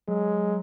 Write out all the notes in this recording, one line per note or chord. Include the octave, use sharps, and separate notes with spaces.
F#3 G#3